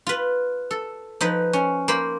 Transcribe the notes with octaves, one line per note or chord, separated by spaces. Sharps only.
F4 B4
A4
F3 D#4 B4
C#4
A#3 C5 B5